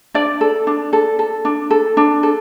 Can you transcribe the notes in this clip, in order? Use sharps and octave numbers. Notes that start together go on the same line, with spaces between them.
D4 D5
A4
D4
A4
A4
D4
A4
D4
A4